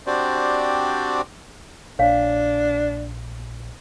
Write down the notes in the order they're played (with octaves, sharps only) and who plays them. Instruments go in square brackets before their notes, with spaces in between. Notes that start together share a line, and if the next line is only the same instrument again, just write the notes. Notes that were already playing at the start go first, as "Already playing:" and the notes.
[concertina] C4 D4 F#4 G4 C5 D5
[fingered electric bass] A#1 [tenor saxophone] D4 [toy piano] C#5 F5 G#5